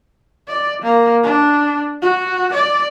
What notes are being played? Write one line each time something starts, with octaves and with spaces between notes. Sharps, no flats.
D5
A#3
D4
F#4
D5